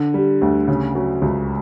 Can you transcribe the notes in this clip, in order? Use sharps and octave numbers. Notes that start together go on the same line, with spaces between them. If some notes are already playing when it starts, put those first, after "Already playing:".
Already playing: D3
G3
D2
C#3
F#3
C#2